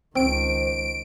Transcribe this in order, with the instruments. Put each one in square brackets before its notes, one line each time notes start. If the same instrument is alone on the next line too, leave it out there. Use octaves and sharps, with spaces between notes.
[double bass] C#2 D#3 [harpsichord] C4 [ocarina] C5 [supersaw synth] D7